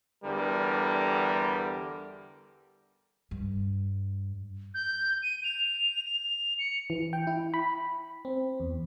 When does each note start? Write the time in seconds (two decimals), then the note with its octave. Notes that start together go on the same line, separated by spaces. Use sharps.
0.24 E2 D3 G3 A#4
3.31 G2
4.74 G6
5.23 D#7
5.44 F7
6.05 F7
6.59 C#7
6.90 E3
7.13 G5
7.27 E4
7.54 B5
8.25 C4
8.60 E2